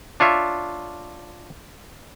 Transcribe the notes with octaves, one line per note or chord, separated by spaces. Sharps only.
D4 F4 C#5 E5